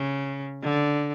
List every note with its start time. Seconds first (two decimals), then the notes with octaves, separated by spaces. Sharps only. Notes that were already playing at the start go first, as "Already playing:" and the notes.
Already playing: C#3
0.63 D3